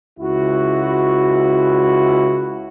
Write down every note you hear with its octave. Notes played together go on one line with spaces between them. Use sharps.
C#2 E4 F#4